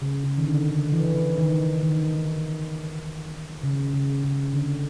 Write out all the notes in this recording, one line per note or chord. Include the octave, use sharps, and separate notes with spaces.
C#3
C#3
D#3
D3
D3
E3
D#3
D#3
C#3
C#3
C#3
D3